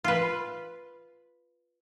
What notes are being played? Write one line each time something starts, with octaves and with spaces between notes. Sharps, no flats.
F4 B4